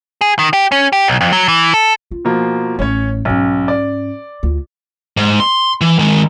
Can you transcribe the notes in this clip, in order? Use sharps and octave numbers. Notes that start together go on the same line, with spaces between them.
G#4
D#3
G4
C#4
G4
B1
F2
F#3
E3
A4
F4
B2 F3 A#3
A1 A3 C#4 C#5
B1 G#2 C#4
D5
D2 F4
G#2
C6
E3
D#3 G#3